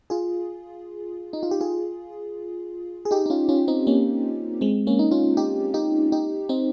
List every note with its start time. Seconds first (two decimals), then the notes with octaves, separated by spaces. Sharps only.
0.10 F4 G#4
1.33 D#4
1.43 F4
1.51 G4
1.61 F4 G#4
3.05 G#4
3.11 D#4 G4
3.26 D#4
3.30 C#4 F4
3.49 C#4 F4
3.68 C4 D#4
3.87 A#3 C#4
4.61 G#3 C4
4.87 A#3 C#4
4.99 D#4
5.11 C#4 F4
5.37 D#4 G4
5.74 D#4 G4
6.12 D#4 G4
6.49 C4 D#4